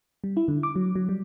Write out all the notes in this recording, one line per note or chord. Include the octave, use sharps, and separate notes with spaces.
G3
E4
D3
D6
F#3
F#3
G3